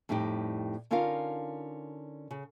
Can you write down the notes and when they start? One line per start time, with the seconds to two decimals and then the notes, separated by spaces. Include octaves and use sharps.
0.09 F2 A2 G3 D#4 G4
0.91 D3 C#4 D#4 F4 A#4 F5
2.31 C#3